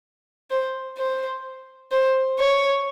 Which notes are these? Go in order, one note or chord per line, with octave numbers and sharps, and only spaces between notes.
C5
C5
C5
C#5